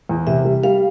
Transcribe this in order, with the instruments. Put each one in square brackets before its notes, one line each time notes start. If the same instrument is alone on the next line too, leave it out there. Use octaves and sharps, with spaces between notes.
[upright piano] E2
[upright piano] C3 [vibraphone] E5
[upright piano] G3
[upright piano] G3 [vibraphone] F5